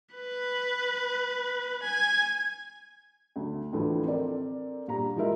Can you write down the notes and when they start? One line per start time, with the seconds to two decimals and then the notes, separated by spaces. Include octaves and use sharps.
0.15 B4
1.83 G#5
3.36 D2
3.73 D2 A2 D3 E3 F3 A3
4.04 C4 A4 A#4 D5
4.88 A#1 G2 A#5
5.16 F3 G#3 D#4 E4 A#4 E5